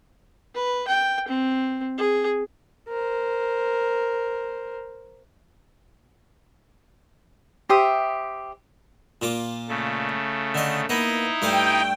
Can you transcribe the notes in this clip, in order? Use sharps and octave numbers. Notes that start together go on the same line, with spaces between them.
B4
G5
C4
G#4
A#4 C5
G4 C5 E5 D#6
A#2 F4 D6
C#3 A3
D3 D#5
A#3 B3 D#4 E4 D#5
G2 A3 F5 G5